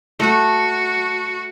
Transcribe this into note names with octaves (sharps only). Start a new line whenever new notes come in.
A3 F#4 F#5